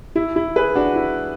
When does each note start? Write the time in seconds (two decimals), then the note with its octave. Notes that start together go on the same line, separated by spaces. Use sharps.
0.16 E4
0.36 E4
0.56 G#4 B4
0.75 D4 F#4
0.96 E4